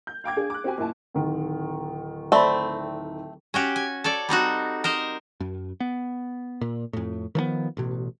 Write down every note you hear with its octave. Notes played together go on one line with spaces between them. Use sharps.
G6
F5 G5 D6 G#6
D4 G#4
D6 F#6
C4 F#4 G4 G#5
F#1 A#2 E4 G#5 A5
D1 D#3
A3 C4 D5 E5 B5
C#4 F#4 G4
G#5
A4 C#5 D5
G3 C4 D#4 F#4
A#4 C5 D#5
F#2
B3
A#2
F2 A2
D#3 F3 G3 B3
A1 B2